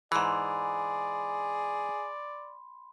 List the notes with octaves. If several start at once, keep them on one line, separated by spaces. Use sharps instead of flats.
G#2 E3 G#4 D5 B5 C6